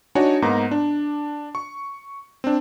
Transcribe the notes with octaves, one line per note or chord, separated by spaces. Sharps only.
D4 D#4 F#4 C#5 G#5
G#2 A#3 B3 A#5
D4
C#6
C4 D4